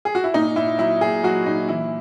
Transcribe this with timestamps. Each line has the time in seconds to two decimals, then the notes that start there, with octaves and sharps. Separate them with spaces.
0.05 G#4
0.15 F#4
0.24 E4
0.34 A#2 D#4
0.56 A#2 E4
0.78 F#3 E4
1.01 A#2 G#4
1.24 F#3 F#4
1.45 A#2 D#4
1.69 E3 E4